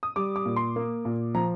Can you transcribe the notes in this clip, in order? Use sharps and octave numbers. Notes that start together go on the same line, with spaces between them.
D#6
G3 D6
D6
A#2
C6
A#3
A#2
F3 A#5